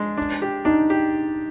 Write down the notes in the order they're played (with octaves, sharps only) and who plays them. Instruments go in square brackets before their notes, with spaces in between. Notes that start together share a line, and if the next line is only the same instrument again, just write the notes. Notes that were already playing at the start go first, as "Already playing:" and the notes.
Already playing: [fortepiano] G#3 D4
D4
G4
[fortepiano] D4 [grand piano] D#4
[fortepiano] G4